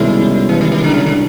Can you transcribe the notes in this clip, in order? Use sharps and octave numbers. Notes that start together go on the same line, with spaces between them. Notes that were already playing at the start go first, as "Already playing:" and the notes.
Already playing: C2 B2 D#3 G#3 C#4 E4
E3
D#3
D#3
D3
C#3
D3